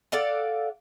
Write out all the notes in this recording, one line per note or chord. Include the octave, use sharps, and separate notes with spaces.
A4 D5 F5 F#5